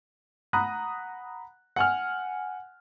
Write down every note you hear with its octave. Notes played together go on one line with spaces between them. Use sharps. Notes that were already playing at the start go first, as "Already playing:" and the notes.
F#5 A#5 B5 D#6 F#6
F#5 G#5 F6